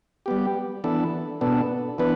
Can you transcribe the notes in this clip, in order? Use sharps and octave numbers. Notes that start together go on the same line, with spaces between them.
G3 B3 G4
E3 B3 D4 A4
B2 B3 D4 A4
E3 B3 D4 B4